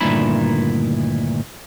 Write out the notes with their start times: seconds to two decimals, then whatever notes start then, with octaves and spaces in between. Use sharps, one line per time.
0.01 D2 G2 A#2 D#3 E4 B5